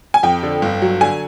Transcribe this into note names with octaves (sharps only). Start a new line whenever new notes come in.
G#5
F2 G5
D3
G1
F#3
D3 G#5